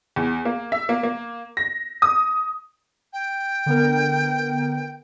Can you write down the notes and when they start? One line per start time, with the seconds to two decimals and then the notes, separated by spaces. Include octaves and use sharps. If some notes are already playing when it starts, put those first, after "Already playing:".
0.16 E2
0.45 A#3
0.72 E5
0.89 A#3
1.03 A#3
1.57 A#6
2.02 D#6
3.13 G5
3.66 D3 B3 A#4